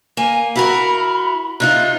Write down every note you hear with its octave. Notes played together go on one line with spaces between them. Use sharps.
A#3 G#5
E4 F#4 A#4 B5
C3 D#4 F4 F#6